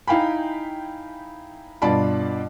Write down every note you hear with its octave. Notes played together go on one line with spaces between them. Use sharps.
D#4 E4 F5 G5 G#5 B5
G2 B2 F4 D5 A5 B5